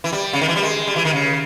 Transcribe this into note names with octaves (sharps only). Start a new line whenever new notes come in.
E3
G3
C#3
D#3
E3
G3
G#3
G3
E3
D#3
C#3